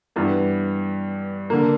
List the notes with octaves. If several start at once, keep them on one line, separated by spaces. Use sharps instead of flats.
G2 E3 B3
D3 A#3